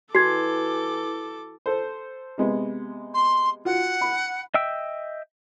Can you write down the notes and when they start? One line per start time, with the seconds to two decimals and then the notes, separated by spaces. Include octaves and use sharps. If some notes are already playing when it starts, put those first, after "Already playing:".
0.15 E3 F#4 A4 D6 G#6 C7
1.66 A4 C5
2.38 C3 G#3 B3
3.14 C6
3.65 F4 F#4 F#5
4.01 B5
4.54 D#5 E5 G5 E6